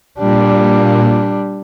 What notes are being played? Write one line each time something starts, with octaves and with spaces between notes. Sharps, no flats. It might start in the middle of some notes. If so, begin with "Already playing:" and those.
A#2 G3 D4